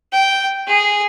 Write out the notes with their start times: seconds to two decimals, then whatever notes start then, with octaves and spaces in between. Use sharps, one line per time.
0.12 G5
0.67 G#4